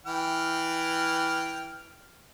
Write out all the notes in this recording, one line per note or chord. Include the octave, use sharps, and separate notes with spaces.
E3 G5 F6